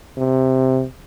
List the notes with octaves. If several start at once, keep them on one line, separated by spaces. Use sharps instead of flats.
C3